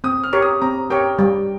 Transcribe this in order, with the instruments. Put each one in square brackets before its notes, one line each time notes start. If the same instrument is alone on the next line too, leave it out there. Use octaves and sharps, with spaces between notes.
[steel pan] C4 [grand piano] D#6
[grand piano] F6
[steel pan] G4 A#4 C#5
[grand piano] D#6
[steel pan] C4 [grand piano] A#5
[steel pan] G4 A#4 C#5 [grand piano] G5
[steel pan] G3